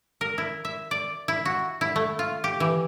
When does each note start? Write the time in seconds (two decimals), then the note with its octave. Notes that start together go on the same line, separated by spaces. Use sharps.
0.21 A#4
0.38 E4
0.65 E5
0.91 D5
1.28 E4
1.45 F#4
1.81 E4
1.96 A3
2.19 F4
2.44 G4
2.60 E3